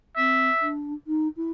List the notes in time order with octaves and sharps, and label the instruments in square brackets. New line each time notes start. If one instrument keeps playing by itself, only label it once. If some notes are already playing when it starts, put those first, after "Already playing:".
[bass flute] C4 [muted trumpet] E5
[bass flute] D4
D#4
E4